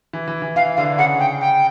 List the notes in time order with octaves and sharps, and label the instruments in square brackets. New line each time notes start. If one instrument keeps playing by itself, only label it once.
[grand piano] E3
E3
E3
[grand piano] E3 [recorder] F5
[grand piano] D3 [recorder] F5
[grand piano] C#3 [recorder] F#5
[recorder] G5
G5